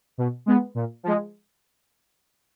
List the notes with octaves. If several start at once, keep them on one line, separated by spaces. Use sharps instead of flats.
B2
G#3 B3
A#2
F3 G#3